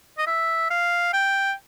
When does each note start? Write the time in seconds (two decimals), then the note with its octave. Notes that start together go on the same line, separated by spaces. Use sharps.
0.18 D#5
0.27 E5
0.70 F5
1.13 G5